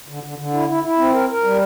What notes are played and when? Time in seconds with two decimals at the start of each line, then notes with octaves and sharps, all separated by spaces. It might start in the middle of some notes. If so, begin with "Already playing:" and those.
0.08 D3
0.23 D3
0.38 D3
0.54 E4
0.68 E4
0.83 E4
0.98 C4
1.14 A#4
1.29 A#4
1.44 G3